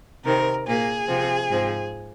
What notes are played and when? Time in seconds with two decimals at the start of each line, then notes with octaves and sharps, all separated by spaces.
0.25 C3 D#3 C4 A#4
0.66 A#2 A#3 G#4
1.08 C3 F3 C4
1.50 G#2 F3 C4